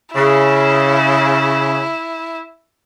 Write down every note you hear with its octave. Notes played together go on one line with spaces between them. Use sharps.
C#3 E4